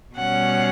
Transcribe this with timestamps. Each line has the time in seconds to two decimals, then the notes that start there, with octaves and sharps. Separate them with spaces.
0.16 B2 G3 C#4 F#5